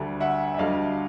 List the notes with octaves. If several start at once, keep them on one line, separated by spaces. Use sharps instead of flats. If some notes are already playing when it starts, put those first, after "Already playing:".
Already playing: D2 D3 G3
E5 F#5
E5
D2 D3 G3 D#5 F5